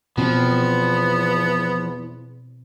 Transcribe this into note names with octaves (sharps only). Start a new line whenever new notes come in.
E2 B2 F3 B3 C4